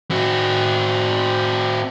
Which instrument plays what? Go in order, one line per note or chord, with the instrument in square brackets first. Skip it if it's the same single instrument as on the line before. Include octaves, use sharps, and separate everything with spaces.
[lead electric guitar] C4 F#4